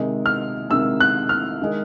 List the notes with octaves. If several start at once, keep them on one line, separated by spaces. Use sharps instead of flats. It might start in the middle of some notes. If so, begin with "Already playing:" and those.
Already playing: C3 D#3 G#3
F6
C3 D#3 G#3 E6
F#6
F6
D#3 G#3